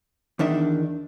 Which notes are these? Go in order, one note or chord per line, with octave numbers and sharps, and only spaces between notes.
E2 D#3 D4 E5